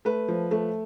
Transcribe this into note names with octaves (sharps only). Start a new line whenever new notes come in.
A3 B4
F3
A3